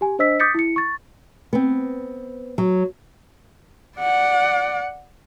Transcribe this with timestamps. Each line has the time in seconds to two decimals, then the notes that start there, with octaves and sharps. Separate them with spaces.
0.01 G4 G#5
0.19 D4 C5 D#5 E6 B6
0.40 D6 D#6 G6 A6 B6 C#7
0.54 E4 C#7
0.76 C#6 A6
1.53 B3 C4
2.58 F#3
3.99 D5 F#5